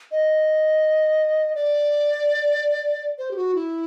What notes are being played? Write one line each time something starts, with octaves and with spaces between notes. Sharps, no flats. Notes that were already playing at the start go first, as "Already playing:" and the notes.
D#5
D5
C5
G4
F#4
E4